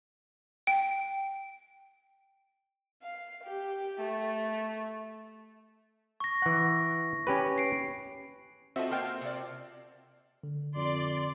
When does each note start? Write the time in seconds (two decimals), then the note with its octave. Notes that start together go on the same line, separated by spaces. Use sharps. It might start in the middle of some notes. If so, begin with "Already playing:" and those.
0.67 G5
3.02 F5
3.44 G4
4.00 A3
6.20 C#6 A#6
6.42 E3 F#5
7.27 C#4 G4 B4
7.58 C7 D7
8.76 C4 F4 F#4 A4 D#5 E5
8.91 A#3 F5 G5 A5
9.21 C3 D5
10.43 D3
10.76 F2 D5 C6